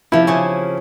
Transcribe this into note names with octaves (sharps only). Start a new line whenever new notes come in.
C3 F3 E4
C#3 C#4